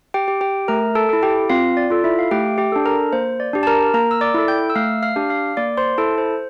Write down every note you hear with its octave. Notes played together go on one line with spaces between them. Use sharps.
G4 G5
G4
G4 G5
A3 A#4 A#5
A4 A5
E4 A4
G4 G5
C4 F4 F5
D5
F4 A4
E4 E5
F5
A3 G4 G5
G4 G5
D4 A4
A#4 A#5
A#3 C5
D5
D4 G4
A5
A#4 A#5
A#3 A#4 A#5
E6
D5 D6
E4 A4
G5 G6
E6
A3 F5 F6
F5 F6
D4 G4
F5 F6
A#3 D5 D6
C5 C6
E4 A4 A5
C5